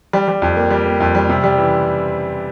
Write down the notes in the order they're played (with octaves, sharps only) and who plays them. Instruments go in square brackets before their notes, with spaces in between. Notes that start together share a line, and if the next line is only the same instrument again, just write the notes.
[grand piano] G3
G3
F2
A#3
G3
A#3
F2
G3
C3
G3
E3